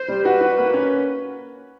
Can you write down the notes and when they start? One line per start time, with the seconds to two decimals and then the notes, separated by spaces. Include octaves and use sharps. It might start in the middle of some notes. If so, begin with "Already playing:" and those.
Already playing: C5
0.08 G3
0.25 F#4 B4
0.41 F#4
0.57 A#3
0.74 C#4